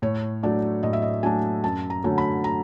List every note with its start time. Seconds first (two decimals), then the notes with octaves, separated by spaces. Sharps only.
0.02 A2 C#5
0.43 F#3 A3 D4 D5
0.83 A2 D#5
0.93 E5
1.02 D#5
1.23 F#3 A3 D4 G#5
1.64 F#2 A5
1.90 A#5
2.04 D3 F#3 A3 C#4
2.18 B5
2.44 A#5